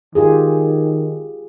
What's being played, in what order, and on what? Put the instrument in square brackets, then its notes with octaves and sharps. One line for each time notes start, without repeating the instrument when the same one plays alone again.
[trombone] D#3 [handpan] F4 G4 G#4